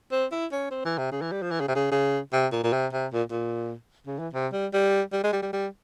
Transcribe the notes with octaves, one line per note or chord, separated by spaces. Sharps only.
C4
E4
C#4
C4
E3
C3
C#3
E3
G3
F3
E3
C#3
C3
C#3
C#3
C3
A#2
A#2
C3
C3
A#2
A#2
C#3
E3
C3
G3
G3
G3
G#3
G3
G3
G3